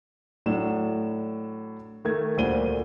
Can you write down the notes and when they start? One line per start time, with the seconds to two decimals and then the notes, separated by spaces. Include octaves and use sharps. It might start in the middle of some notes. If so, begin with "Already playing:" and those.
0.46 A2 F#3 D4 E7
2.05 D#3 A3 G#6
2.37 D2 A#2 G3 C5 D#7 G7